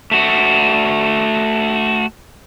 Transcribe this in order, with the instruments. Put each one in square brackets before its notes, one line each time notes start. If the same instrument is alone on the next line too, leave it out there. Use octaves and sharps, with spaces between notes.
[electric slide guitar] A3 F#4